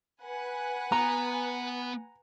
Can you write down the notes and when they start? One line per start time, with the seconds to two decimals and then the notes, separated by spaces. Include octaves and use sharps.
0.24 B4 F#5 G#5
0.92 B3 A#5